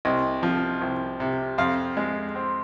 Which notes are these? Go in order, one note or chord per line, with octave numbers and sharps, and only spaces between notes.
C2 D#5
F3
C2
C3
F2 F5
G#3
C4